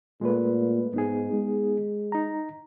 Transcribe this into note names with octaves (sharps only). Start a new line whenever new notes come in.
A#2 G#3 A3 B4
G#2 B3 D#4 G#4
G#3
D#4 A#5